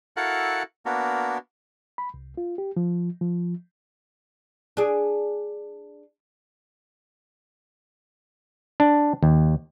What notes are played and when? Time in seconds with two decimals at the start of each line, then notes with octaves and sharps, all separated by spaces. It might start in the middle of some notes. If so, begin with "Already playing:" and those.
0.17 E4 F#4 A4 A#4 F5 F#5
0.86 A#3 B3 D4 F#4 A#4
1.98 B5
2.14 C2
2.37 F4
2.58 G4
2.77 F3
3.21 F3
4.77 D4 G#4
8.80 D4
9.23 D#2